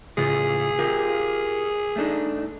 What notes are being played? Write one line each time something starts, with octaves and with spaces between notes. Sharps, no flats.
A2 C#3 F4 G#4
F4 G4 A#4
A3 D4 D#4